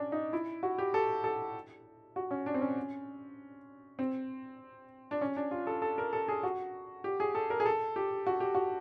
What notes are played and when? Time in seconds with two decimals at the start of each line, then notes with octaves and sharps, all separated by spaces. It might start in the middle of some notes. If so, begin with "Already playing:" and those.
Already playing: C#4 D4
0.12 D#4
0.33 E4
0.63 F#4
0.78 G4
0.94 A4
1.24 A4
2.16 F#4
2.31 C#4
2.46 D4
2.54 C4
2.61 C#4
3.99 C4
5.11 D4
5.21 C#4
5.36 D4
5.51 F4
5.67 A4
5.82 A4
5.98 A#4
6.13 A4
6.28 G#4
6.43 F#4
7.04 G4
7.20 G#4
7.35 A4
7.50 A#4
7.60 G#4
7.66 A4
7.96 G4
8.27 F#4
8.40 G4
8.55 F#4